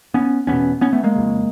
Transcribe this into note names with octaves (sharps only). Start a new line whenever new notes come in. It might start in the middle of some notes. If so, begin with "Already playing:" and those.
B3 C#4
E2 B2 B3 C#4
B3 C#4
A3 B3
G#3 A#3
F2 C#3